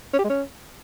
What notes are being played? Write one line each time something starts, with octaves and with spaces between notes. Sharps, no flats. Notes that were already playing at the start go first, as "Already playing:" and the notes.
C#4
G4
G#3
C#4